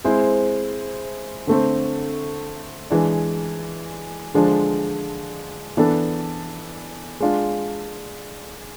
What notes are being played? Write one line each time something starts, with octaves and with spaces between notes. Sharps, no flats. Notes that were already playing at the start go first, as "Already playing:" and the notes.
G#3 C4 E4 G#4 C5
D3 A3 C4
E3 G#3 D4
D3 F3 G#3 D4
E3 B3 D4 A4
G#3 D4 F4